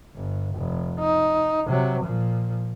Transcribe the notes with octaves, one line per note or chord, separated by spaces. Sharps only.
G1
F1
D#4
C3 F#3
A#2 F3